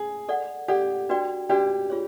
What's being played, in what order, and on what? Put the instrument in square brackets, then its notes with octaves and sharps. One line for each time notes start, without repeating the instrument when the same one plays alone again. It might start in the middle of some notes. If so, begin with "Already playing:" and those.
Already playing: [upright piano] G#4
[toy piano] A4 D5 F#5
[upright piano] G4 [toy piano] A4 D5 F#5
[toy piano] D4 F#4 B4 D5 G5
[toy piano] D4 F#4 B4 D5 G5 [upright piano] G4
[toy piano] F4 G#4 C#5